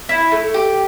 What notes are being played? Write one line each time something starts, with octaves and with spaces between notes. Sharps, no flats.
E4
A3
G4